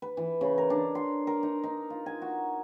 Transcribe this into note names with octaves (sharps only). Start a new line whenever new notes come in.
B4
E3
C#3
A#4
D4
C6
A#4
D#4
D#4
F4
G#5
F#4